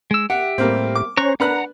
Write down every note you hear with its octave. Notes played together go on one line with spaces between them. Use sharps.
G#3 E6
G4 E5 F#5
A2 G3 A#3 C4
D6
C#4 C5 C#5 A#5 C#6 F#6
D4 B4 F#5 A#5 F#6